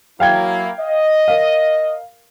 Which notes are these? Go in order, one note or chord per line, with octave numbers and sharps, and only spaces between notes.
F#3 A#3 E4 F5 G5 G#6
D#5
A#4 F5